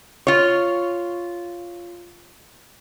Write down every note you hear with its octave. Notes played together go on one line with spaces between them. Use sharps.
F4 C#5